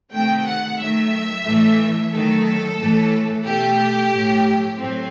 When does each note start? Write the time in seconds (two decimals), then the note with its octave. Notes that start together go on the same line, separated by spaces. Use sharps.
0.12 C3 D#3 A3 G5
0.45 F#5
0.79 D#3 F#3 A3 E5
1.45 A2 E3 A3
2.12 D#3 F#3 A3 A4
2.79 A2 E3 A3
3.45 B2 A3 G4
4.11 A2 F#3 A3
4.78 A2 F#3 A3 C4